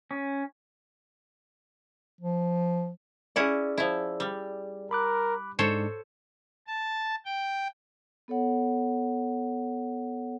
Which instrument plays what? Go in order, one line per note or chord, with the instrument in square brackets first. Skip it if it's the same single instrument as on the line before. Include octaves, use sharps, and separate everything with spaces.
[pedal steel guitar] C#4
[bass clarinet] F3
[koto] C#4 E4 F#5 [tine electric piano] G#4 D5
[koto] F3 E4
G3
[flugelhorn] A#4 [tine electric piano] B5 D6 F#6
[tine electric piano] G#2 [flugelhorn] D4 [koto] A4 C5 C#5
[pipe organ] A5
G5
[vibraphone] B3 A4 C#5 F#5